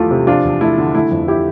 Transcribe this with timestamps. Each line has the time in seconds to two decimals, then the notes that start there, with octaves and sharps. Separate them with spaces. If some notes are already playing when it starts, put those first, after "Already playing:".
Already playing: E2 F3 A3 E4 F4 G4 A4
0.11 C3
0.27 F3 D4 F4
0.44 E2
0.61 A3 E4
0.78 D3
0.94 A3 E4
1.12 F2
1.28 E4 G4